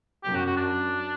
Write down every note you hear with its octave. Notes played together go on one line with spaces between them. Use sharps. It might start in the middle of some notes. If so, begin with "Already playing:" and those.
F#2 G4
F#4
F#4
D4